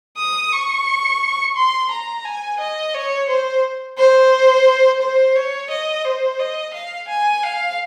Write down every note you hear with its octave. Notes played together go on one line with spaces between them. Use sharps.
D#6
C#6
C6
A#5
G#5
D#5
C#5
C5
C5
C5
C#5
D#5
C5
D#5
F5
G#5
F5